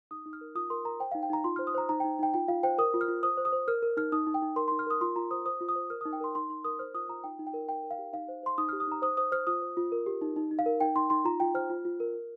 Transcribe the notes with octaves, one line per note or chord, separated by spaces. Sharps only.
D#4 D#6
D#4
F6
A#4
F4 D#6
A#4 C6
A#4 A#5
C5 G5
D#4 F5
G5
D#4 A#5
F4 C6
C5 F6
D#6
C5 A#5
D#4 A#5
D#4 G5
D#4 G5
F4 G5
F4 F5
C5 G5
A#4 D#6
F4
F6
F4
C5 D#6
C5
D#6
C5
A#4 F6
A#4
D#4 F6
D#4 D#6
D#4
G5
D#4
A#4 C6
D#4 C6
F6
A#4 D#6
F4 C6
F4 A#5
C5 D#6
C5 D#6
F4
D#6
C5
A#4 F6
D#4 D#6
G5
A#4 C6
D#4 C6
D#4 C6
A#4 D#6
C5 F6
F4 D#6
F4 A#5
D#4 G5
D#4
G5
A#4
D#4 G5
A#4
F5
G4
D#4 F5
C5
C5 C6
D#4 D#6
G4 F6
D#6
D#4 A#5
C5 D#6
C5 D#6
C5 F6
F4 D#6
C5
F4
A#4
G4
D#4
D#4
D#4
F5
A#4
D#4 G5
D#4 C6
D#4 C6
F4 A#5
F4 G5
C5 F6
F4
F4
A#4
A#4